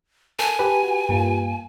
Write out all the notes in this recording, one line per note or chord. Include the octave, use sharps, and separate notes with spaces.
A4 A#4 G#5
G4 B4
F#4
G2 A#3 F4